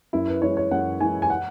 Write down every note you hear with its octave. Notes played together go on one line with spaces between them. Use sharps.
F#2 E4
B4
E3 G#3 C#5
C#5
F#2 F#5
E3 G#3 G#5
G#5
F#5